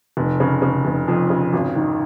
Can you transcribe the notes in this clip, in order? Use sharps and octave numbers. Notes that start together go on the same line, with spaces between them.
F1
C#3
C#3
F1
F2
C#3
G#1
D#3